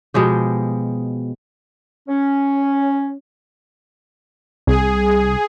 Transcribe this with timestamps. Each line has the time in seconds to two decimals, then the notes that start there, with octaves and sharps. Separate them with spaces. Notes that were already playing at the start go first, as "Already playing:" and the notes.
0.14 B2 F3 G#3 G4
2.09 C#4
4.67 C2 G#4